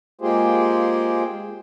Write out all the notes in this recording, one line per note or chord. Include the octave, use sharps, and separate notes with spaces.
G#3 A#3 F4 G4 G#4 C5